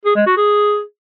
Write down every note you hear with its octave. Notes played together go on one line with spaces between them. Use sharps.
G#4
G#3
F#4
G#4